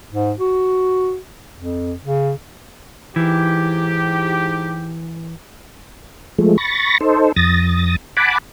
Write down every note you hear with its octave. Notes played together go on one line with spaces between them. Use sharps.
G#2
F#4
F2
C#3
G#2 E3 D#4 G4
F3 G#3 A3
B5 C#6 A6 A#6
D#4 A4 C5
F2 D#6 A6 A#6
F#5 G#5 A5 B5 D6